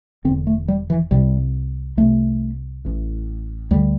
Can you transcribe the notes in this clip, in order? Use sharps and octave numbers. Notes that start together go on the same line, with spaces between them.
E1 E2 D3 C4
A3
G3
E3
C2 C3 G3
C2 C3 A3
A1 A2
D2 D3 G3